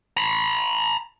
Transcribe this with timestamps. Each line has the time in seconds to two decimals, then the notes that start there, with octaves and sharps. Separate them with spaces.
0.17 A#5 B5